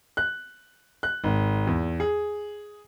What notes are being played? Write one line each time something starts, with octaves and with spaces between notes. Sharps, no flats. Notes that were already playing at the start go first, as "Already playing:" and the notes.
F#6
F#6
G#1
E2
G#4